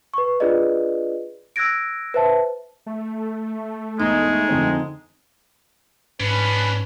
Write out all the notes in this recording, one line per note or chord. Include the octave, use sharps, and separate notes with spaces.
B4 C#6
D4 F4 G#4 B4 D5 D#5
E6 F#6 G#6 A#6 D7
B4 C5 E5 A5
A3
E2 G#3 D#4
F2 D3 C4
G#2 C#4 D4 B4